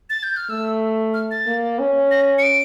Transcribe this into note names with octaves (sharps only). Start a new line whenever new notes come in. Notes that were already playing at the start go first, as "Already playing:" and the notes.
A6
G6
F6
A3 E6
F6
A6
A#3
C#4
A#6
C#7
D7